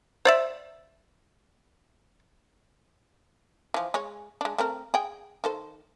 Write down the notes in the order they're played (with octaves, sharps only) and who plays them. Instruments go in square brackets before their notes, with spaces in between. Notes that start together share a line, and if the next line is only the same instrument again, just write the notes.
[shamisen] C5 D5 E5
E3 F3
G#3 G#4 C#5
G#3 D4
A3 C4 A#4
G#4 G5
D#3 A4 C5